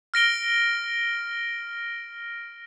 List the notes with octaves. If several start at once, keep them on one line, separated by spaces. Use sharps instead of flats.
F6 A#6 D7 G7